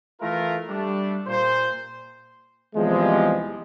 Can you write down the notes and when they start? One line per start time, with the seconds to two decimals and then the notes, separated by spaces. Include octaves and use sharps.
0.21 E3 A3 E4 F4 A#4
0.69 G3 A3 D4
1.27 A#2 C5
2.76 E2 C3 F3 G3 G#3